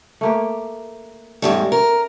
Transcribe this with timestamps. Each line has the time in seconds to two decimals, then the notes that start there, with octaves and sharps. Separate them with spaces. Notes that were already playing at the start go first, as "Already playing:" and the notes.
0.21 A3 A#3 G4
1.42 E2 G#2 G3 A3 C#4
1.72 A#4